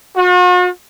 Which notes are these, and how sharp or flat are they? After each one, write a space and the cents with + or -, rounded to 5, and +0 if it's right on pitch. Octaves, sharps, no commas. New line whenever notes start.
F#4 -45